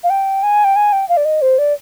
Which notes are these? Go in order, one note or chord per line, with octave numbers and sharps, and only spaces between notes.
F5
G5
G#5
G5
G#5
G5
F5
D5
D#5
C5
D5